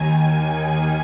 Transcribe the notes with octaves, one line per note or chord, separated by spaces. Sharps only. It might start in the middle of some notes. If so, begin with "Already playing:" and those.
Already playing: D#2 D#3 G#5